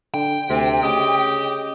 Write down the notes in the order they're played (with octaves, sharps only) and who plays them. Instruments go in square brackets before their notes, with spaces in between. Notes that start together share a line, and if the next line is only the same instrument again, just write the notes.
[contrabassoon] D3 [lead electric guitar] G5
[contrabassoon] D2 [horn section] C3
[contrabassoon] C#3 [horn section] G4 D#5